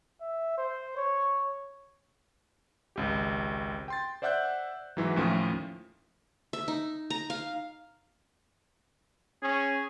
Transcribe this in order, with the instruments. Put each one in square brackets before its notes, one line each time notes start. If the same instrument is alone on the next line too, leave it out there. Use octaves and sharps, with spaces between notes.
[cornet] E5
C5
C#5
[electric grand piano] G#1 C#2 G4
G5 C6 A6
C5 D5 E5 F#5 F#6 G6
G#2 E3 F#3
D#2 A2 F3 A3 C#4
[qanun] E5
D#4
A#5
F5
[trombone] C#4 [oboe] G#4